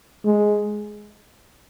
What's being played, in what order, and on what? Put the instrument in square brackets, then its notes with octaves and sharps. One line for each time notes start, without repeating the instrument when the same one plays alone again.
[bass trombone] G#3